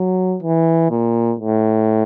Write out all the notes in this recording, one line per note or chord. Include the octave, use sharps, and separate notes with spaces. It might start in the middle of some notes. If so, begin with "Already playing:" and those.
Already playing: F#3
E3
A#2
A2